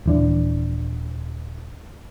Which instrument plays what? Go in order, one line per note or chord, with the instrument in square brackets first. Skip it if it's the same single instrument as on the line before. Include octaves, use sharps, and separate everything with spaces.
[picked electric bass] D#1 E3 D4